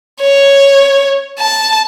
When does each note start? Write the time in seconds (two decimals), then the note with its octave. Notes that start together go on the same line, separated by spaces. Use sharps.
0.21 C#5
1.39 A5